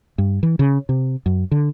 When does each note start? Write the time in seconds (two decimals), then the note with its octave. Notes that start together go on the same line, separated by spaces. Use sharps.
0.18 G2
0.43 E3
0.59 C#3
0.89 C3
1.26 F#2
1.51 D3